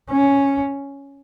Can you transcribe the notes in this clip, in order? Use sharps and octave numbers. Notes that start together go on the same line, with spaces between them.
C#4